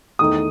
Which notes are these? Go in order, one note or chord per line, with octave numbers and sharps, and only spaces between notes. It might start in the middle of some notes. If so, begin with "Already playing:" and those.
E2 D#3 A3 D#4 D#6